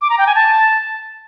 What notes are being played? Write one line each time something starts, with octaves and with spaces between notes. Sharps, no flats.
D6
A#5
G5
G#5
A5